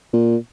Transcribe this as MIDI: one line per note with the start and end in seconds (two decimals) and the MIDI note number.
0.13 0.37 46